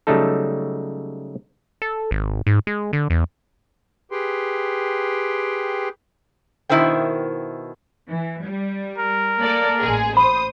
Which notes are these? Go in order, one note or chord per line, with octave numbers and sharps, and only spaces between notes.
C#3 F#3 G3 A3 D#4 A4
A4
G#1
G#2
G#3
D3
E2
G4 G#4 B4 G5 C6
B2 D#3 E4 A#4 C5 G5
E3
G3
A#4
A#3 A4 D5
A1 G#3 G#4
C5 B5 D#6